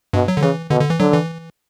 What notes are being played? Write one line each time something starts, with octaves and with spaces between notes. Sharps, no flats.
G2 B2
F#3
D3
C#3 E3
B2 D3
D3
E3
D3 F#3
E3